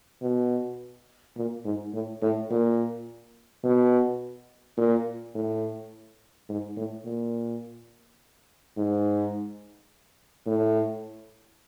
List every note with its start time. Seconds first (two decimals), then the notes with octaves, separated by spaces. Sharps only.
0.22 B2
1.37 A#2
1.65 G#2
1.94 A2
2.22 A2
2.51 A#2
3.64 B2
4.78 A#2
5.35 A2
6.49 G#2
6.77 A2
7.05 A#2
8.77 G#2
10.47 A2